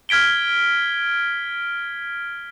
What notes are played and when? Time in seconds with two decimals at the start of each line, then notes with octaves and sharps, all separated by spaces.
0.09 F6 G#6 B6 D7 G7